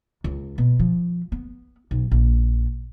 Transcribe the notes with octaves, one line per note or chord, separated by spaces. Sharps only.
C#2
B2
F3
B3
B1
A#1